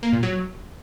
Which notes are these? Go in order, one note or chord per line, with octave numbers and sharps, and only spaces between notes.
A#3
A#2
F#3